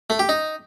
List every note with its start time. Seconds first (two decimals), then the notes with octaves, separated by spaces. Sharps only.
0.10 A3
0.19 G4
0.29 D#4